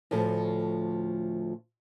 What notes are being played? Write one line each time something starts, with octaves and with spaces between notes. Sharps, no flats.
D2 A2 F3 A4